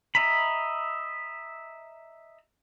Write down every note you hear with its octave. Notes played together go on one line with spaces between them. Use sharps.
D#5 E5 A#5 B5